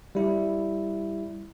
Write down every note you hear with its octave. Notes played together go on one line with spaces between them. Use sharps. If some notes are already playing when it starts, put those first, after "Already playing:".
G3 E4